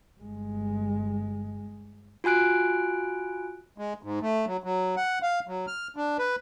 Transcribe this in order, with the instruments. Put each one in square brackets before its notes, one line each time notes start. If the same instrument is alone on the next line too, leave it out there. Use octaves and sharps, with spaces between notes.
[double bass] G1 G#3
[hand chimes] F4 F#4 G#5 F#6 D7
[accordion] G#3
G#2
A3
F#3
F#3
F#5
F5
F#3
F6
D4
B4